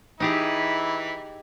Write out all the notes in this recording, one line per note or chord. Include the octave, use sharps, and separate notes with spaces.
E3 D#4 E4 G4 G#4